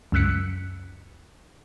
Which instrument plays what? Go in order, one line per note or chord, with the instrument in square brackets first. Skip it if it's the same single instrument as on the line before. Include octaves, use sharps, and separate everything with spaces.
[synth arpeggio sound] C#2 F#2 E6 F#6 B6 C#7